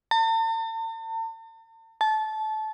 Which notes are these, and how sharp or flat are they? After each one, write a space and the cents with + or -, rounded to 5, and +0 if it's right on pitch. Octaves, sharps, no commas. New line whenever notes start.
A5 +45
A5 -20